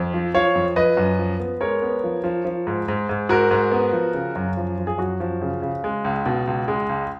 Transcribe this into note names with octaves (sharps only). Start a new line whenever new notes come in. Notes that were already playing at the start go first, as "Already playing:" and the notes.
Already playing: F2
F3
F3 C#5 F5
F2
F3 B4 D#5
F#2
F3
B3
G#3 A#4 C#5
B3
F3
F3
F3
G#2
G#2
G#2
G#2 F#4 A#4
G#2
B3
F3
C#3
F#2
F3
F3
G#4
F#2 F#4
F3
C#3
C#3
G#3
C#2
B2
C#2
G#3
C#2